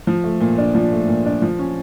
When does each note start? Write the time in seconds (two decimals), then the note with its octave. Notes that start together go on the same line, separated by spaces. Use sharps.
0.07 F3
0.24 A3
0.41 A#2
0.58 D4
0.75 F3
0.92 A3
1.08 A#2
1.26 D4
1.42 F3
1.59 C#4